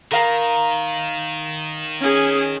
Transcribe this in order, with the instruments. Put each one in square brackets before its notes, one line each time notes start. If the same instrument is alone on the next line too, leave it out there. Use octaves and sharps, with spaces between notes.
[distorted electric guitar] D#3 [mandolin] A#4 F5 A#5
[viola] C#4 G#4